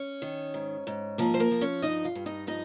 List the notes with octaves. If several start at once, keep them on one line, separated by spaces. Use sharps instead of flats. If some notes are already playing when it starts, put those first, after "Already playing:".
Already playing: C#4 C#5
D#3
G#2
G#2
F3 A#3 A#4
C5
A#3 A#4
F3
C#4 C#5
G2 D#4 D#5
F4 F5
G2
D#4 D#5
F3 D#4 D#5